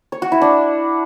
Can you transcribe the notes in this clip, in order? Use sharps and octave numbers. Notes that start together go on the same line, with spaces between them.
C#5
F#4
E4
D4